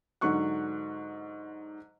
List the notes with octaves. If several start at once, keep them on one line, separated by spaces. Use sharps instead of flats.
G#2 D3 F#3 C#6 F#6